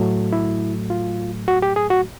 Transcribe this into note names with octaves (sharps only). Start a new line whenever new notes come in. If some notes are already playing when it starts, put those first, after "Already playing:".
Already playing: A2 F#3 A3
E4
F4
F#4
G4
G#4
F#4